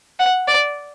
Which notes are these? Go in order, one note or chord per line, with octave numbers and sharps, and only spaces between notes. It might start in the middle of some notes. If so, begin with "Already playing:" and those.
F#5
D5